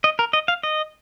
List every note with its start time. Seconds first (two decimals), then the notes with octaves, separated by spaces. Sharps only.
0.04 D#5
0.19 A#4
0.33 D#5
0.48 F5
0.63 D#5